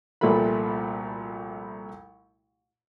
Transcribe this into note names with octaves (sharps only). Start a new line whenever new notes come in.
C2 A#2 F3 A3 F#4 B5